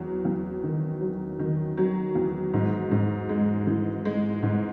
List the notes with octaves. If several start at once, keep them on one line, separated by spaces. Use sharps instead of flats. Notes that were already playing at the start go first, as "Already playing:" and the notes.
Already playing: E2 F#3
E2
D#3
F#3
D#3
F#3
E2
G#2
G#2
G#3
E3
G#3
G#2